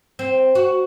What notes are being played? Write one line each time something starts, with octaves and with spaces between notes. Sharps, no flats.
C4
F#4